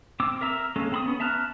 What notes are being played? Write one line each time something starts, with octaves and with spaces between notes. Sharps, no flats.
C4 D6 E6
A#4 E5 A#5 E6
G#3 A#3 C#4 A4
C4 B5 D#6
B3 C#4
E5 A5 A#5 F6 F#6